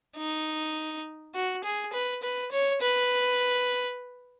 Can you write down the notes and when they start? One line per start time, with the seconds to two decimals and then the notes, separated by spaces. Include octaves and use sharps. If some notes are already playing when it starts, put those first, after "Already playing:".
0.16 D#4
1.35 F#4
1.64 G#4
1.93 B4
2.22 B4
2.52 C#5
2.81 B4